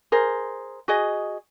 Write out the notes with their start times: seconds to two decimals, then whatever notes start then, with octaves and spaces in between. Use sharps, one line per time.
0.12 G#4 A#4 C5
0.88 F#4 G#4 D#5